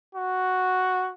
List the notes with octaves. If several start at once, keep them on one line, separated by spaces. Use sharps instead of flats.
F#4